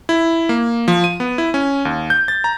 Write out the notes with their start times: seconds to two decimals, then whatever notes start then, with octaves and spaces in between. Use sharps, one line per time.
0.09 E4
0.49 A#3
0.88 F3
1.04 D#7
1.20 B3
1.38 E4
1.54 C#4
1.85 D#2
2.10 G6
2.28 A6
2.44 A#5